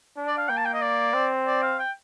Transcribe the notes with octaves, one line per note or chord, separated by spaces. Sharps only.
D4
D5
F5
A#3 G5
A5
G5
D#5
D5
C4
D5
F5
G5